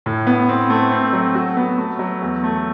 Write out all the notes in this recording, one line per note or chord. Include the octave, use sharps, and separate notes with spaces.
A2
B3
C4
A3
C4
F#3
F#4
B3
A3
F#3
E2
A3